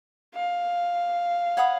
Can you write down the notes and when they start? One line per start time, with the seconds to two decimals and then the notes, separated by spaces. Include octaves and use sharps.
0.35 F5
1.57 C#5 F#5 B5 D#6